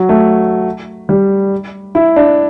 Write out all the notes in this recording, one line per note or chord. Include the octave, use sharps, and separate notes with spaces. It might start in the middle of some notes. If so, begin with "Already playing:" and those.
Already playing: F#3
A3
G3
E4
D4